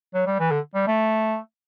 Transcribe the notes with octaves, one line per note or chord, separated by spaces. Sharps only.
F#3
G3
E3
D3
G3
A3